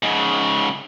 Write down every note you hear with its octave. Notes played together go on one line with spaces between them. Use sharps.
G#2 C#3